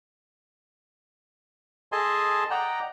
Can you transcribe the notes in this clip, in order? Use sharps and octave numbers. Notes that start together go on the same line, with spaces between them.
G#4 A4 D#5 G#5 A5 C6
D5 D#5 F#5 G5 A#5